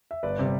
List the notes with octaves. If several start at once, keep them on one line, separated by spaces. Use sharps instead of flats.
E5
G1 B4 D5
C3 G3